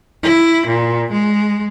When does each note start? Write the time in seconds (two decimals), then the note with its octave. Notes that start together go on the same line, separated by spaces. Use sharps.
0.22 E4
0.67 A#2
1.12 G#3